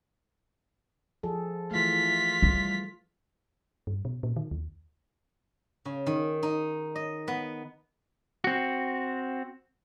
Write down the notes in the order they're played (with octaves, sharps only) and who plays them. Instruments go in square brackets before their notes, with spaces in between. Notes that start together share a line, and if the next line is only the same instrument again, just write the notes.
[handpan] F3 G#4 A4
[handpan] E3 A3 [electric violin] F4 B6
[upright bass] G3
[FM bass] G2
B2
A#2
D#3
D#2
[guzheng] C#3
D#3
D#4
D#5
B3
[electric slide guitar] C4 F#4